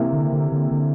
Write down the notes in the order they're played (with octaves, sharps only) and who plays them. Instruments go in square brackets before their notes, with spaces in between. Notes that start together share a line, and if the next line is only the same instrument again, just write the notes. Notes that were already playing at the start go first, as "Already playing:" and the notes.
Already playing: [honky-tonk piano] C3 E3 A#3 E4
[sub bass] D3
D3
D3
D3